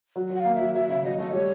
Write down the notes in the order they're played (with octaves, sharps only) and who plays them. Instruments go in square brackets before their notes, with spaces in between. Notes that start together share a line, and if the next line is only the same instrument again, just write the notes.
[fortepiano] F#3
F#3
[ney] F#5
[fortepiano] A#3 [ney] F5
[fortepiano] F#3 [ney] E5
[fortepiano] F#3 [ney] E5
[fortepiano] C#3 [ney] E5
[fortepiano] F#3 [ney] D#5
[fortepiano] A3 [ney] D#5
[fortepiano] G3 [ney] C#5